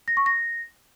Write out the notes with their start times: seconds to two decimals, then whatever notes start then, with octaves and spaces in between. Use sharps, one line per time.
0.08 A#6
0.17 C#6
0.26 A#6